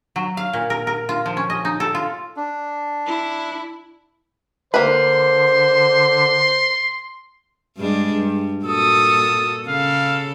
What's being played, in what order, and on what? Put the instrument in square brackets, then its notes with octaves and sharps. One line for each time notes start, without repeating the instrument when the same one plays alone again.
[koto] F#3
F5
A#2
A#4
A#4
F4
F3
C#4
D#5
D#4
A4
F4
[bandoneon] D4
[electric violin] E4
[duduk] D3 [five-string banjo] A#3 B4 [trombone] C5 [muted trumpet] C6
[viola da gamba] G2 G#3 D4
G2
[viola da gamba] A#2 F#4 A4 [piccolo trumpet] D#6
[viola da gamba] C#3 A4 [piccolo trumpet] F5